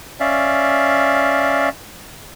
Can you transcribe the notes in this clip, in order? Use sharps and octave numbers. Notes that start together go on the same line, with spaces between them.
C#4 D5 E5 F5